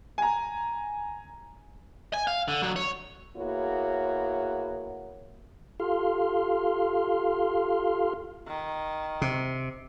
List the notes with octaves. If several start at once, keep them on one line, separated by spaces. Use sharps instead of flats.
G#5 A#5
G#5
F5
D3
D3 F#3
C#5
A#3 B3 E4 F#4 G#4 C#5
F4 G4 A4 F5 C6 F6
D#3
C3